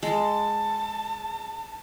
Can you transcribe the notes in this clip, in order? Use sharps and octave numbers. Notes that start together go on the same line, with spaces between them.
G#3 A5